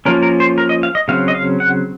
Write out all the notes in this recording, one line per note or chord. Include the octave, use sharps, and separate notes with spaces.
F3 A#3 C#4 A#4
A#4
C5
A#4
D#5
F5
D#5
C#3 F#3 C4 F5
D#5
F5
F#5